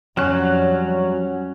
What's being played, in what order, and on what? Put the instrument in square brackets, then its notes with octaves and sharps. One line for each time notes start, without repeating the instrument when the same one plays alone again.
[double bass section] F2 G3 [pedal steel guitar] F#3 F#6 [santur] C#4